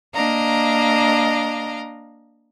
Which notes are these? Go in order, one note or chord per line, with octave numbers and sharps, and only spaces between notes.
A#3 D4 D#5 F5 A#5